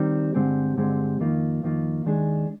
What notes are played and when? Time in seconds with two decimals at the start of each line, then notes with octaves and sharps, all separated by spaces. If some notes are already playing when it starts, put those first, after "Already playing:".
Already playing: D#3 G3 C4
0.34 G2 D3 G#3 C4 G4
0.77 G2 D3 G#3 C4 G4
1.20 F2 D#3 A#3 F4
1.63 F2 D#3 A#3 F4
2.05 D#2 D#3 G#3 D4 G#4